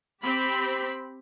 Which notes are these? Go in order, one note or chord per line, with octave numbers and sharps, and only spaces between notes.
C4 G4 B5